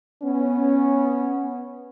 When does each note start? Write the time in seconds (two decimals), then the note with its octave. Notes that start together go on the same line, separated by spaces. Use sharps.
0.23 B3 C#4